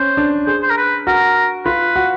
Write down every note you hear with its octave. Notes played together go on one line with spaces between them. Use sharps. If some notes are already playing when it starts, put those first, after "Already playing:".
Already playing: C#4 C5
D4
G#4 C5
C5
A#4
B4
F#4 A#4
F4 B4
F#4